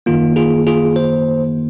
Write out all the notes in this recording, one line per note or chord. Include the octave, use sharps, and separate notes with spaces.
F#2 D#3 A#3 F4
F4 G#4
F4 G#4
C5